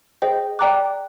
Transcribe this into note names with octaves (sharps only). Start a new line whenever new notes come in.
G#4 C5 D#5 G5
D5 G5 A#5 D6 F#6